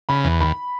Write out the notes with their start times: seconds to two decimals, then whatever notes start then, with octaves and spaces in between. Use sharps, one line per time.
0.09 C#3 B5
0.25 E2
0.40 D#2 B5